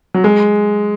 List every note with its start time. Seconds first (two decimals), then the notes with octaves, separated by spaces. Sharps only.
0.14 F#3
0.24 G#3